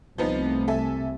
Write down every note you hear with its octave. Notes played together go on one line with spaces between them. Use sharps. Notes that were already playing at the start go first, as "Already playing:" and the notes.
C2 C3 F3 A3 B3 D#4
A4 E5 G#5